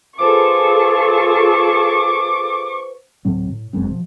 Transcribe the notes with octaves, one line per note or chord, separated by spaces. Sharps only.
F4 G#4 A4 B4 C5 C#6 D6
D2 A2 F#3 C4
A2
F1 F#2 G#3 C4
B2 F3